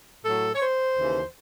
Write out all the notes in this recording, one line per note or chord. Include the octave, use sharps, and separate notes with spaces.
A2 F#3 A4
C#5
C5
D#2 C#3 E3